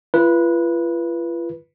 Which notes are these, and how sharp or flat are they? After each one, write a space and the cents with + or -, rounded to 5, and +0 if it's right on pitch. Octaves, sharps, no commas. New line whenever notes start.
F4 -45 B4 -15